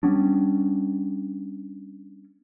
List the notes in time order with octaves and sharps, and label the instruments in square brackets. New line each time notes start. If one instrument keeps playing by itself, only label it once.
[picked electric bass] G3 B3 C#4 D4